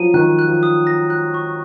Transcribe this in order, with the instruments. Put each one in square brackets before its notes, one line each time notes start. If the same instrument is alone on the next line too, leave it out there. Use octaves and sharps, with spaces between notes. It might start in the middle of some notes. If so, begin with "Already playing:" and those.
Already playing: [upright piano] F3 F#3 [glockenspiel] D#7
[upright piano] D#3 [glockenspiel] F#6
[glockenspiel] F#6
[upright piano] F3
[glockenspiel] D#6
A#6
F#6
C#6